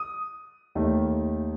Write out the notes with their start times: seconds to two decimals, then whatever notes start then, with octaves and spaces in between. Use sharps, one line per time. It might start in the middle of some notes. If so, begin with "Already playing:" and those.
Already playing: D#6
0.75 D#2 D#3 A3